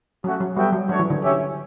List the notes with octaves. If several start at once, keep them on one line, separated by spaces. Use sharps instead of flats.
F#3 A3 C#4 F#4
F#3
G3 B3 F#4 A4 E5 G5
F#3
F#3 A3 D4 F#4 C#5
E3
D3
C#4 G4 C#5 E5